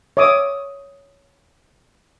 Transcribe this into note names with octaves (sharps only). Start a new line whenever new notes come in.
C#5 E5 D6 D#6